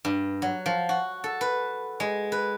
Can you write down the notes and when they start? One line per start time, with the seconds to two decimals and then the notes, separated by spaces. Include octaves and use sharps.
0.05 G2
0.42 F#3
0.66 F3
0.89 F#4
1.24 A4
1.41 B4
2.00 G#3
2.32 B4